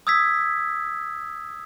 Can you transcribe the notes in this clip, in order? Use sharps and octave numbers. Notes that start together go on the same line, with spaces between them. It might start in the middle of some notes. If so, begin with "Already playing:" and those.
D#6 E6 G#6 B6